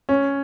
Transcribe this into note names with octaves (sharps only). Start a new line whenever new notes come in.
C#4